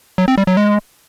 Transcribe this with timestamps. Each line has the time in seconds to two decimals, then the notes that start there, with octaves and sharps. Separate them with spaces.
0.18 F#3
0.28 C4
0.38 G3
0.47 F#3
0.57 G#3